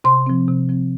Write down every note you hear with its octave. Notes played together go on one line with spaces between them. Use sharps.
C3 C6
F3 C4
C3
F3 C4